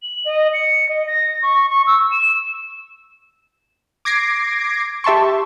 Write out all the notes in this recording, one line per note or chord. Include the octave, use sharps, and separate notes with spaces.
F#7
D#5
C#7
D#5
A#6
C#6
C#6
E6
E7
D6 G#6 A#6 C7 D7
G4 E5 A5 C6 C#6